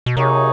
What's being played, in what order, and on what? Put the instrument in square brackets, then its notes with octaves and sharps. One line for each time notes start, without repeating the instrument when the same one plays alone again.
[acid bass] B2
[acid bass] C3 [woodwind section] F#3 A#3 D#4 G#4 C#5